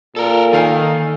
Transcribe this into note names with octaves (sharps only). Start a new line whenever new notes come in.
A#2 A4 A#4
D#3 A4 F5 G#5